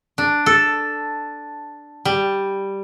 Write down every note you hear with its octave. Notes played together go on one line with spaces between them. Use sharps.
D4
A4
G3